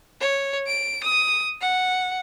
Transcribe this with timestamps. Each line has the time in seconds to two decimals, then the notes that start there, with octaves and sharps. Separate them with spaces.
0.21 C#5
0.67 D7
1.04 D#6
1.61 F#5